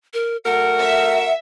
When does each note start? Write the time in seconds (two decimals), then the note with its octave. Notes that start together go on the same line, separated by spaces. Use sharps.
0.14 A#4
0.45 A3 F#4 A#4 F#5
0.80 E5